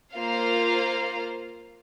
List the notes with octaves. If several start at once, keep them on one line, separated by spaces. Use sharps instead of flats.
A#3 F4 C5 F5